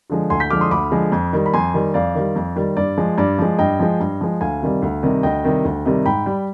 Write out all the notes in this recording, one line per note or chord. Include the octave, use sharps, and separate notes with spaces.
D3 F3 G#3
D2 G#5 C6
G6 B6
D3 F3 G#3 D6 F6
C6 D#6
D2 B5 D6
D3 F3 G#3
F2
D#3 G3
B5
F2 G#5 C6
D#3 G3
F2 D5 F5
D#3 G3
F2
D#3 G3
G2 D5
F3 G#3
G2 D5
F3 G#3
G2 D#5 G5
F3 G#3
G2
F3 G#3
D2 F5 G#5
C3 D#3 G3
D2
C3 D#3 G3
D2 D#5 G5
C3 D#3 G3
D2
C3 D#3 G3
G#2 G5 B5
G3